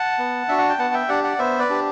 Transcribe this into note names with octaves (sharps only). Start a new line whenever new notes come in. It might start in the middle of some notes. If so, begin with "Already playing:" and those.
Already playing: F#5 A5
B3
D4 F#4 E5
F#5
G5
B3 F#5 A5
E5 G5
D4 G4 D5 F#5
D5 F#5
B3 C5 E5
B4 D5
D4 G4